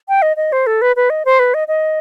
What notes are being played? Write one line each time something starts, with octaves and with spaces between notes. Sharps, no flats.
G5
D#5
D#5
C5
A4
B4
B4
D#5
C5
B4
D#5
D#5